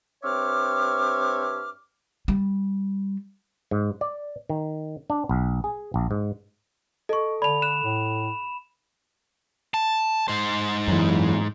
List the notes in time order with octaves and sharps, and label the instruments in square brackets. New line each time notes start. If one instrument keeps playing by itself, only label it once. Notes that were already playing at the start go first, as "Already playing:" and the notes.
[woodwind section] G2 C4 C#5 E5 D6 F6
[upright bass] G3
[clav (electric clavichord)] G#2
D5
D#3
D4
B1
G#4
A#1
G#2
[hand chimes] A4 [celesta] D#5 C#6
[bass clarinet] D3 [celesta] D5 A5 [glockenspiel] B5 F7
[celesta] F#6 [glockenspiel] E7
[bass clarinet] A2
[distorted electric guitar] A5
G#2 C5
[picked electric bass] F#2 E3